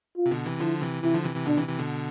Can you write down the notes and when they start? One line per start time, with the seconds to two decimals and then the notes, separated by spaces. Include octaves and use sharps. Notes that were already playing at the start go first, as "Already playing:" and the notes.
0.17 F4
0.26 C3
0.31 B2 D3
0.46 C3 E3
0.60 D3 F3 E4
0.82 C3 E3
1.03 C3 E3 E4
1.14 D3 F3
1.25 C3 E3
1.35 C3 E3
1.46 B2 D3 D4
1.57 C3 E3
1.68 C3 E3
1.79 B2 D3